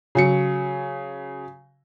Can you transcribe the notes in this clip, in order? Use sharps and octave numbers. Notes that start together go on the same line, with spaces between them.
C#3 F#3 C#7